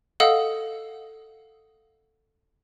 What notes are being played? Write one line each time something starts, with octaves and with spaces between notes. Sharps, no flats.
A4 D#5 F5 F#5 D#6 E6